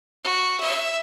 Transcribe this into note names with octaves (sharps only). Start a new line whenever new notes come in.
F#4
E5